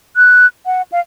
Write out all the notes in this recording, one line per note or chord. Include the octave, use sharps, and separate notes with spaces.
F#6
F#5
F5